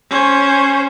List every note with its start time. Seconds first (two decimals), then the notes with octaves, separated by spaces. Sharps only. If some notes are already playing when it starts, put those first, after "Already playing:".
0.10 C#4 C5